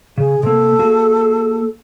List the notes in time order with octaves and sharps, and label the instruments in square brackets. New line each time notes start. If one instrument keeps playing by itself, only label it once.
[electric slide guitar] C#3 [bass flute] G#4
[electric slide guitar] C3 A#3 [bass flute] A4
[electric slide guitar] A#3 F#4 G#4